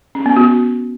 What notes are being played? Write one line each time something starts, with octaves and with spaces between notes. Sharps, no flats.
C#4
B3
F#4